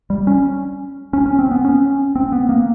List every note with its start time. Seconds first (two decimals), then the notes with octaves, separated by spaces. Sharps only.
0.10 G3
0.27 C#4
1.13 C#4
1.26 C#4
1.39 C4
1.51 B3
1.65 C#4
2.16 C4
2.32 B3
2.49 A#3